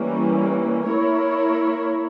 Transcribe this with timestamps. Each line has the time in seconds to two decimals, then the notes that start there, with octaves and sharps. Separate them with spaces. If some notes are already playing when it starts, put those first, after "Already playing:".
Already playing: E3 G3 A#3 C#4
0.88 A#3 E4 A#4 C#5